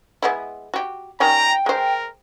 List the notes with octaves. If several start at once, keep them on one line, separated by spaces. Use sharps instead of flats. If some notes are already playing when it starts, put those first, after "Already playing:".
G#3 B3 E4
F#4 G4
D#3 G3 C#4 G5 A#5
G#3 A#4 C5